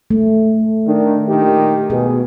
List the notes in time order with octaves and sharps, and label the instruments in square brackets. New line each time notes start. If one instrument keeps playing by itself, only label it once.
[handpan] A3
[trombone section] D#3 D4
A#2 D#3 G4
[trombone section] B2 [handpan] G#4